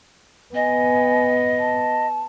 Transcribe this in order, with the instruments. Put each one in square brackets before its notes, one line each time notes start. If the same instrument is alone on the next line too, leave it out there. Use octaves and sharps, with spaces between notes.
[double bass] B3 [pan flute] D#5 [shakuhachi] G#5
[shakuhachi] A5